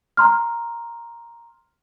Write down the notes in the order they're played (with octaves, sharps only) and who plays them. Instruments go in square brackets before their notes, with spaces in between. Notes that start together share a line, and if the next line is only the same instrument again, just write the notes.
[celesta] A#5 C6 F6